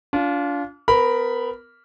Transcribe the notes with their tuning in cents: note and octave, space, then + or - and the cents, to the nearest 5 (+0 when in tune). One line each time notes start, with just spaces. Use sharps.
D4 -35 F4 +5
B3 +30 A#4 +0 B5 +0